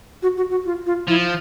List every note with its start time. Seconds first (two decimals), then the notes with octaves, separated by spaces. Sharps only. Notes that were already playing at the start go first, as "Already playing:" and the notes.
0.23 F#4
0.37 F#4
0.50 F#4
0.66 F4
0.86 F4
1.08 F3 E4